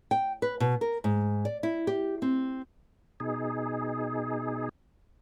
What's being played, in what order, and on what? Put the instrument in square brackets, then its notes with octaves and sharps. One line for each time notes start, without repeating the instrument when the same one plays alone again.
[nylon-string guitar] G5
B4
B2
A#4
G#2
D5
E4
G4
C4
[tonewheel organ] B2 D#4 G#4